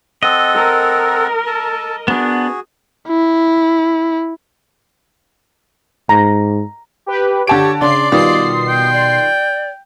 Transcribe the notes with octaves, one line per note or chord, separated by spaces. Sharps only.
C4 A4 D#5 F#5
A#4
A4 A5
B3 D4 F#4 G#4
E4
G#2 A#5
G4 B4
D3 G4 C#5 A5 D7
C#3 D4 D5 C6 C7
B2 D#3 G3 F4 C6 D#6 C7
G5
D5